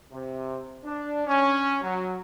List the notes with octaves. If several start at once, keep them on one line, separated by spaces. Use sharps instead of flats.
C3
D4
C#4
F#3